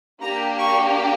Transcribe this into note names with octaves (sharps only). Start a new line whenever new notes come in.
A#3 D4 G4 A#5
C#6